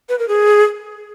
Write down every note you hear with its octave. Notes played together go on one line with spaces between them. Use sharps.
B4
A#4
G#4